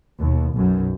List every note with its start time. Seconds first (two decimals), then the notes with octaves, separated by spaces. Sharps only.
0.19 D#2 B2
0.57 B1 F#2